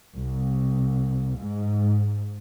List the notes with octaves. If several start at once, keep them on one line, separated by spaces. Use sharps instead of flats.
C2
G#2